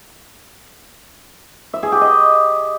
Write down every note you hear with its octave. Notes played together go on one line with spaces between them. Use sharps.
E5
G#4
G4
D#5